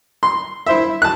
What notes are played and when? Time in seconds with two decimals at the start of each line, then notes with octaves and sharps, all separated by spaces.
0.23 C6
0.66 E4 C5 E5
1.02 A5 F#6